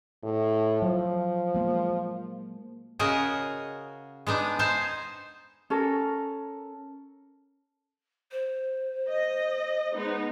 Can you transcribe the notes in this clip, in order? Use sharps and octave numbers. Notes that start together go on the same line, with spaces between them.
A2
F3 F#3
G#3 A#3
C#3 F#4 G#4 A#4 D#5
G#3 B3 D4 D#4
D#4 C5 G#5 A5
C#4 A4 A#4
C5
D#5
G#3 B3 D#4